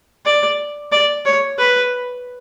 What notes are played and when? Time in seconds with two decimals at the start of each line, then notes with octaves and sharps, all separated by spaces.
0.25 D5
0.92 D5
1.25 C#5
1.58 B4